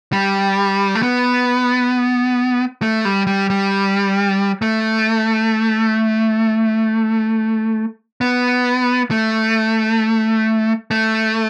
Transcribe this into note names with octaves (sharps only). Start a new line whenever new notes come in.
G3
A3
B3
A3
G3
G3
G3
A3
B3
A3
A3